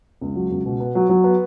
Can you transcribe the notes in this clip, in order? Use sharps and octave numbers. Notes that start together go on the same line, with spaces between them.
C#2
F#3
C#2
B2
B3
F#3
F#3
B3